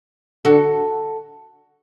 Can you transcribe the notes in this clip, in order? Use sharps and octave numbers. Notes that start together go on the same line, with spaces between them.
D3 F#4 A4